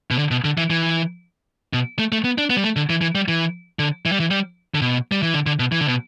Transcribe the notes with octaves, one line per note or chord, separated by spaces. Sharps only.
B2
D3
B2
D3
E3
E3
B2
A3
A3
B3
D4
B3
G3
A3
D3
E3
E3
G3
E3
D3
E3
G3
E3
G3
D3
B2
G3
E3
D3
D3
B2
E3
D3
B2